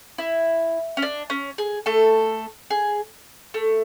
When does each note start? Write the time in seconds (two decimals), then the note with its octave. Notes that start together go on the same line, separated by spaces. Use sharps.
0.18 E4
0.97 C#4
1.02 D4
1.30 C#4
1.58 G#4
1.86 A3 A4
2.70 G#4
3.54 A3